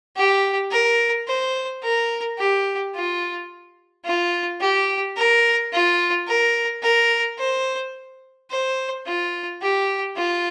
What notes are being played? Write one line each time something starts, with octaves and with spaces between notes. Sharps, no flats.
G4
A#4
C5
A#4
G4
F4
F4
G4
A#4
F4
A#4
A#4
C5
C5
F4
G4
F4